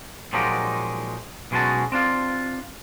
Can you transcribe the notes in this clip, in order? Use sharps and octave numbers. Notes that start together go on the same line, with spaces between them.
A#2 F3 F#3 G#3 D#4 G4
B1 B2 G#3 C#4 F#4 A5
C4 D4 F4